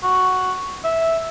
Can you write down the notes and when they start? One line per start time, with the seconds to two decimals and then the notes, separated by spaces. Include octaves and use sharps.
0.03 F#4
0.84 E5